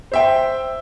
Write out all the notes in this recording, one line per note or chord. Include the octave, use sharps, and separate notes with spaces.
C5 E5 G5